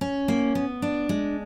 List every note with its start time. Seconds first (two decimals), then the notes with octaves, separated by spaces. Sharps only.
0.01 C#4
0.28 A#3
0.55 B3
0.82 D4
1.09 G#3